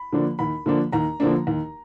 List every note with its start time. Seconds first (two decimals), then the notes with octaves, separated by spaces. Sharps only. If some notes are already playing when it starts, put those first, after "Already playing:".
Already playing: B5
0.13 D3 F3 A#3 D4
0.39 D#2 B5
0.66 D3 F3 A#3 D4
0.92 D#2 A#5
1.20 D3 F3 A#3 D4
1.47 D#2